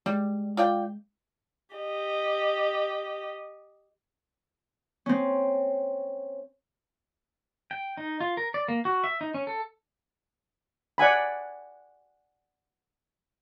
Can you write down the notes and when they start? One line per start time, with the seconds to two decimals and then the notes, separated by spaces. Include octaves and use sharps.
0.06 G3 G#3
0.57 F4 D5 G5
1.76 G4 D#5
5.06 C4 C#4
7.71 G5
7.97 D#4
8.21 F4
8.37 A#4
8.54 D5
8.68 A#3
8.85 F#4
9.04 E5
9.21 D#4
9.34 C#4
9.47 A4
10.98 D5 F#5 G#5 B5